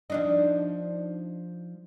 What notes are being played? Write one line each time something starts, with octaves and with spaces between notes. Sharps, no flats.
F3 D4 D#4